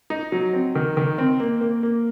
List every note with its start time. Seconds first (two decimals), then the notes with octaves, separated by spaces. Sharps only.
0.10 D#4
0.32 F#3
0.53 C4
0.75 D#3
0.97 D#3
1.18 C4
1.40 A#3
1.61 A#3
1.83 A#3